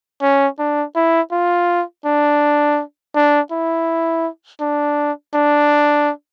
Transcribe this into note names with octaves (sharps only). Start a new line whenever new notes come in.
C#4
D4
E4
F4
D4
D4
E4
D4
D4